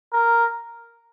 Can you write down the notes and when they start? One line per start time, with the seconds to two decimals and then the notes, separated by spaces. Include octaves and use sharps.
0.13 A#4